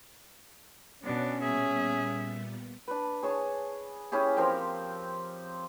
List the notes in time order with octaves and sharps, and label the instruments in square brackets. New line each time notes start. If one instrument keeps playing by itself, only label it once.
[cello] B2 D4 [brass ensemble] C#4
[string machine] A#2 G3 B3 [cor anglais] G#4 [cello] E5
[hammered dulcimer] D4 B4
G#4 C#5 A5
C#4 E4 G4 G#4
F3 C4 A#4 G5